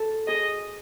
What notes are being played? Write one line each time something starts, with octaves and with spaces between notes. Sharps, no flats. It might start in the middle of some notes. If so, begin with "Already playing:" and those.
Already playing: A4
G#4 D#5